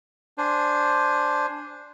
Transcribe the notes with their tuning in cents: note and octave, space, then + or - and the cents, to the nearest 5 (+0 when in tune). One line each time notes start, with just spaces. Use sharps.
D4 +0 C5 +0 G#5 +0